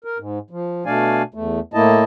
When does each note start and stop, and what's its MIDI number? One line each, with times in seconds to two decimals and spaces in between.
0.04 0.18 70
0.18 0.39 44
0.50 0.84 53
0.86 1.23 47
0.86 1.23 57
0.86 1.23 62
0.86 1.23 74
0.86 1.23 77
0.86 1.23 80
1.34 1.60 40
1.34 1.60 57
1.74 2.04 45
1.74 2.04 57
1.74 2.04 58
1.74 2.04 64
1.74 2.04 75
1.74 2.04 81